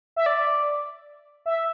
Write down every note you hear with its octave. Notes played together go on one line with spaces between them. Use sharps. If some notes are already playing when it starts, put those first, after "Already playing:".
E5
D5
E5